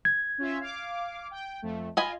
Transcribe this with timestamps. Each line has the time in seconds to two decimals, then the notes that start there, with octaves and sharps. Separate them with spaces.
0.05 G#6
0.38 C#4 F4 E5
0.60 F5 D6
1.31 G5
1.62 F2 A3
1.97 F4 D#5 G#5 B5